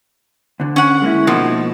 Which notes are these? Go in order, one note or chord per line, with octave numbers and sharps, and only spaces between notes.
D2 D3
C#4 F#5
G#3 A#3 E4
B2 F3 A#3 D#4